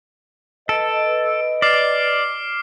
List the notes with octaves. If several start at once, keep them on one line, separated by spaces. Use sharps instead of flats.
A4 B4 D#5 D7
D5 D6 F6 C7